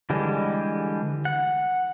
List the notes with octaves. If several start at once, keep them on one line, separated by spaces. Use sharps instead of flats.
D3 E3 G3 G#3
F#5